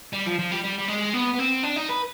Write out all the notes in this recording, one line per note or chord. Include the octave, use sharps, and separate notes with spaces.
G3
F3
F3
G3
G3
G3
G#3
B3
B3
C4
D4
D#4
B4